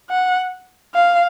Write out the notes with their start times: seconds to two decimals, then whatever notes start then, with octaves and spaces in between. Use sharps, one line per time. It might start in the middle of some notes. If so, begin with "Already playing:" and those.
0.10 F#5
0.95 F5